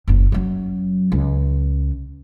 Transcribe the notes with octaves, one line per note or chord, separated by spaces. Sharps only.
F#1 D#2
F#2 F#3
C#2